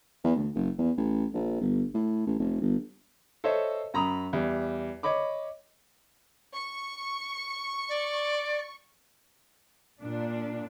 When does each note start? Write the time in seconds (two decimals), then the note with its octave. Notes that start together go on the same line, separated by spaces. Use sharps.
0.24 E2
0.36 D2
0.55 F#1
0.78 E2
0.97 A1
1.34 A#1
1.61 G1
1.94 A2
2.27 A1
2.40 F1
2.62 G1
3.44 A4 C5 C#5 D#5 E5
3.94 F#2 A#5 B5 D#6
4.33 E2 G3
5.03 C#5 D#5 B5 D6
6.55 C#6
7.89 D5
10.01 A#2 D4